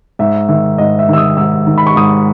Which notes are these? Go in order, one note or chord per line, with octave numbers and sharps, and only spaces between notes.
G#2 E5
D#3 E5
G#2 D#5
E5
D#3 E6
D#6
G#2 E6
D#3
B5
C#6
G#2 D#6